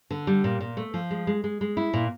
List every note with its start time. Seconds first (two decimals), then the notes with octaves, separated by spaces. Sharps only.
0.10 D3
0.27 G3
0.44 A#2
0.60 A#2
0.77 A3
0.94 F3
1.11 G#3
1.27 G#3
1.44 G#3
1.61 G#3
1.77 E4
1.93 A#2